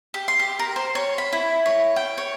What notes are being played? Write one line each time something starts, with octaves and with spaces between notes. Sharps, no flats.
G4
C6
G4
A#4
C5
C#5
B5
E4
C#5
G5
C#5